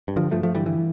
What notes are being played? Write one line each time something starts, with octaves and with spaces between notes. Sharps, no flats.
G2
D3 F3
G2 F3 A3
F3 A3
D3 E3 G3
E3